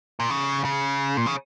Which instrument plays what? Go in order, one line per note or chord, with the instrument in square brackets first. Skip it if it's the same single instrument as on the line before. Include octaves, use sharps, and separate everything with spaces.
[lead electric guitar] A#2
C#3
C#3
A#2
C#3